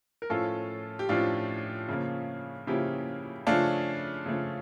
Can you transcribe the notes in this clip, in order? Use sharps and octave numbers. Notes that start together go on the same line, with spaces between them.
A#4
A2 F3 C#4 F4 A4
G4
A2 F3 C#4 D4 F4
C#3 F3 A#3 C#4
C#3 F3 A#3 C#4 E4 G4
C#3 F3 A3 C#4 D4 F4
C#3 F3 A3 C#4